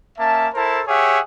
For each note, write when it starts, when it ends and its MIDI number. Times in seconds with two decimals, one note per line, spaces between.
0.18 0.48 58
0.18 0.48 61
0.18 0.48 76
0.18 0.48 81
0.54 0.81 64
0.54 0.81 69
0.54 0.81 70
0.54 0.81 72
0.54 0.81 81
0.87 1.19 67
0.87 1.19 68
0.87 1.19 73
0.87 1.19 76
0.87 1.19 78